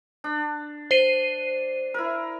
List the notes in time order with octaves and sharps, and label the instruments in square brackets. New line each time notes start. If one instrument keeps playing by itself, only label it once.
[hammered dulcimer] D4
[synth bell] C5 C7 D#7
[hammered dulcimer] E4 A#4